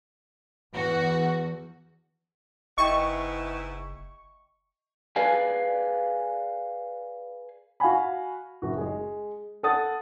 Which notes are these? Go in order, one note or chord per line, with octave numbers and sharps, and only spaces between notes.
E2 F#4
F#1 G#2 B3 E4 D#5 E5 G5 C#6
G#4 B4 D5 F5 G#5
F#4 F5 F#5 G#5 B5
F#1 F#4
G#3 G#4
A4 F#5 D#6 A6